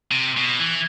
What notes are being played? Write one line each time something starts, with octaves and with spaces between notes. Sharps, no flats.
C3
B2
E3